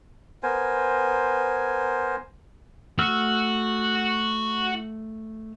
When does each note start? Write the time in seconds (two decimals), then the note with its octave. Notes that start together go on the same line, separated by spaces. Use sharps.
0.43 B3 A#4 C5 G#5
2.99 A3 F#4 E6 F6